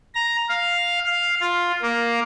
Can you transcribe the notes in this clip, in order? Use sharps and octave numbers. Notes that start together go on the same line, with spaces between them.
A#5
F5
F5
F4
A#3